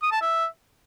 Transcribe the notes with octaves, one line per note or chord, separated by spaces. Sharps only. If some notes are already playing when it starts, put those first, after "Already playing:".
D#6
A5
E5